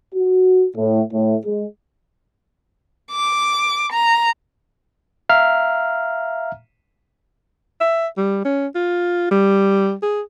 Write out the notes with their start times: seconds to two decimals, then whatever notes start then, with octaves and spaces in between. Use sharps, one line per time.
0.15 F#4
0.76 A2
1.13 A2
1.45 G#3
3.12 D6
3.92 A#5
5.29 E5 F5 A#5 F6
7.80 E5
8.17 G3
8.45 C#4
8.75 F4
9.31 G3
10.03 G#4